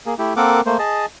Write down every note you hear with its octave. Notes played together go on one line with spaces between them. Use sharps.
A#3 G#4
A3 E4 G4
A#3 C4 A4 A#4 F#5 D6
A3 A#3 C5
G#4 D#5 A5